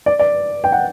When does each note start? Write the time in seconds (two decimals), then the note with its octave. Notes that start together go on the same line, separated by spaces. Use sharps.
0.06 D5
0.19 D5
0.64 G5
0.72 F#5